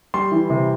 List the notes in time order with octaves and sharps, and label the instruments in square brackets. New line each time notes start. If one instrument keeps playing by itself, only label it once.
[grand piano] G3 C6
E3
C3